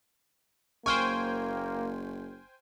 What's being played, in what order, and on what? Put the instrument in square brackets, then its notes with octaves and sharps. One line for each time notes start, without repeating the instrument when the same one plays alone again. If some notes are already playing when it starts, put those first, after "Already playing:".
[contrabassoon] F#1 [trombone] A#3 [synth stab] C5 G5 G#5 [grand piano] C#6 F6